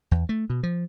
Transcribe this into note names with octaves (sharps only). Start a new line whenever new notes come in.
E2
A3
B2
F3